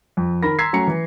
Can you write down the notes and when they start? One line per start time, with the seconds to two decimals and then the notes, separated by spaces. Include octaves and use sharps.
0.17 F2
0.43 D#3 A#4 B5 A#6
0.59 A#5 C6 E6 G#6 B6 C7
0.73 F#3 A3 C#4 A#5 C#7
0.87 E3